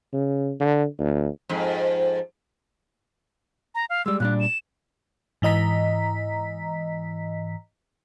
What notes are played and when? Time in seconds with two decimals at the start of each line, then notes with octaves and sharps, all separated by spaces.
0.13 C#3
0.60 D3
0.99 D2
1.49 F2 G#2
3.75 A#5
3.90 F5
4.06 G3 G#3 E6
4.20 A#2 G3 D4 F#6
4.40 E7
5.42 G#2 E3 D#5 A#5 B6